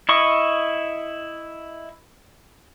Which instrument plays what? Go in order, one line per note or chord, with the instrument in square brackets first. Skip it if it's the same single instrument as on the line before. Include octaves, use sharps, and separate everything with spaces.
[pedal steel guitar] E4 D#5 C#6